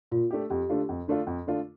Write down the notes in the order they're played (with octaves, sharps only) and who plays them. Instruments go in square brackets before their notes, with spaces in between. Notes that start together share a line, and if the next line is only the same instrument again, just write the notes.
[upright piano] A#2 [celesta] F4
[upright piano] A3 D4 G4
[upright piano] F2 [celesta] G4
[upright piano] D3 A3 D4 F4
F2
D3 A3 D4 F4
F2
D3 A3 D4 F4